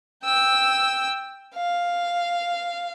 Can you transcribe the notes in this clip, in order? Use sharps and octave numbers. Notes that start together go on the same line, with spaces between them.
G5 E6
F5